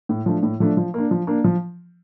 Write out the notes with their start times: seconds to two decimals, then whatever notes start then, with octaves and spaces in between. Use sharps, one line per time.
0.09 A2
0.26 F3 A3 D4
0.43 A2
0.60 F3 A3 D4
0.77 F3
0.94 A#3 D4
1.11 F3
1.27 A#3 D4
1.44 F3